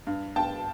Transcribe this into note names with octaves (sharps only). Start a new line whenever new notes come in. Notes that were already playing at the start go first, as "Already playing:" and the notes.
G2
G2 G5 A5